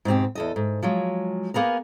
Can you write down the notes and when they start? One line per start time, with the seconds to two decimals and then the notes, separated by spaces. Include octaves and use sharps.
0.05 G#2 B2 C4 G4
0.35 E2 A4 D#5
0.56 G#2
0.83 F3 F#3 G#3
1.54 A#3 B3 G#4 A#4